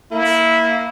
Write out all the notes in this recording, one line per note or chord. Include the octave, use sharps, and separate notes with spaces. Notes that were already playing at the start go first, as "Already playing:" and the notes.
A#3 E4